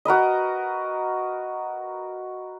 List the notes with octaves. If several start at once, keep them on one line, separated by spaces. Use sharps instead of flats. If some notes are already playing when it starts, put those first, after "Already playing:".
F#4 A#4 B4 D#5